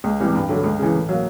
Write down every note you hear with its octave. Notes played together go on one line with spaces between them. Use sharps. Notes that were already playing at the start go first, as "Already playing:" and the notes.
C#2
C3 E3 G3
G2
D3 F#3 A3
C#2
C#3 E3
A2
F#3 A#3